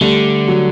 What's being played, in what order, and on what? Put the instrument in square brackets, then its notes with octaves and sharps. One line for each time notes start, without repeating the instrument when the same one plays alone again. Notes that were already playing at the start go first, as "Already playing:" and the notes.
[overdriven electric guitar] D3 [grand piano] G3 A3
[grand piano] F#3